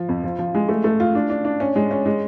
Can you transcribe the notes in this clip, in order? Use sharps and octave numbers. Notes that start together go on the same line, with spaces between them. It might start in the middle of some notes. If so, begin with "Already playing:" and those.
Already playing: F3
F2
F3
F3
G#3
A3
A3
F4
D4
D4
D4
C#4
G#3
C#4
G#3